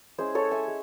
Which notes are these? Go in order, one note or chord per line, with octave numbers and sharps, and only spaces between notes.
G#3 C#4 E4 G#4 C5
A4 C#5
E5 G#5
G#3